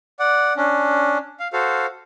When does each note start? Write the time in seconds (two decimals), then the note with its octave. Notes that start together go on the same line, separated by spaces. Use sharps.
0.19 D5 F#5
0.57 C#4 D4
1.40 F5
1.53 F#4 A4 C5 F5